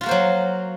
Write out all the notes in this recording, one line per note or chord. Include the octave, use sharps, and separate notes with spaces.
F#3 A#3 F4 F#4 C5